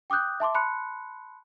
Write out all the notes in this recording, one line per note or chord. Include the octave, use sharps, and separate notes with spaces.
G5 D6 D#6 F#6 G6
E5 A5 C6 D6
A5 B5 C6 F#6 C#7